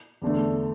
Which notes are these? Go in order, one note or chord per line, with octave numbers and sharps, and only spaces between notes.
E2 D3 A3